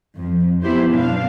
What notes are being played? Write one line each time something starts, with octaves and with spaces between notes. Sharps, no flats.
F2 F3
B3 E4 G4 C5
F#2 B2 D4 F5